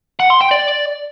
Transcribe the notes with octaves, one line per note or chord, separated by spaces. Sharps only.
F#5
C6
G5
D5